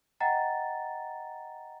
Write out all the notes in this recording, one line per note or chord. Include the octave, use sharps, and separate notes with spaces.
D#5 F#5 G5 A#5 A6